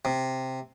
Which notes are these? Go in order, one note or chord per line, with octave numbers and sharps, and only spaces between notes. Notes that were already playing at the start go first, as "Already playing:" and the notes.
C3